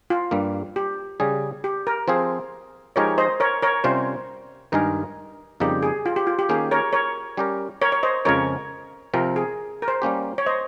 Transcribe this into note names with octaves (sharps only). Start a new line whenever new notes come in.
F4
G2 G3 A#3
G4
C#3 G3 C#4 G#4
G4
A#4
F3 C4 F4 G#4 C5
F3 G#3 D#4 G4 A#4 C#5
C5 D#5
A#4 C#5
A#4 C#5
C3 G3 C#4 F4 C5
G2 D#3 G#3 D#4 G#4 A#4
F2 C#3 G3 A#3 D#4 G4
G#4
F4
G4
F4
G4
D#3 A#3 C#4 G4 G#4
A#4 C#5
A#4 C#5
G3 C#4 G4 A#4
A#4 C#5
C#5
C5 D#5
F2 C#3 F3 G#3 C#4 A#4 C#5
C3 F3 C4 A#4
G#4
A#4
C5
G3 A#3 C#4 G4
C#5
C5 D#5